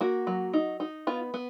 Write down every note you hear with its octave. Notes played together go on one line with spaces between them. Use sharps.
A#3 F#4
F#3
D#4
D#4
B3 F4
B3